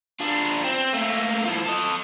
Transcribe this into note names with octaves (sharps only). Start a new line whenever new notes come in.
D4 F4
C4
A3 A#3
E3 F4
A4 D#5